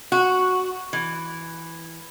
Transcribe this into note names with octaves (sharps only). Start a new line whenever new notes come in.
F#4
E3